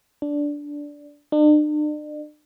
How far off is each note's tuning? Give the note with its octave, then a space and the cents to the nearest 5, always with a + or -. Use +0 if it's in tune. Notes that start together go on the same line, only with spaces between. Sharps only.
D4 -10
D4 +40